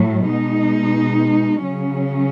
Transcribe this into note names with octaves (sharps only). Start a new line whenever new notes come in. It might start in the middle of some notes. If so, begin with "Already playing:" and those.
Already playing: A2 F#3 A3
B2 G#3 D#4
C#3 F#3 C#4